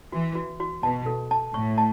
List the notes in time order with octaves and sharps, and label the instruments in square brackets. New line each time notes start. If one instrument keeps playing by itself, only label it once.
[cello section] E3 [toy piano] F#4
[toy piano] F#4
F#4
[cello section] B2 [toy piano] A5
[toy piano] A4
A5
[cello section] A2 [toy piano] C#6
[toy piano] A5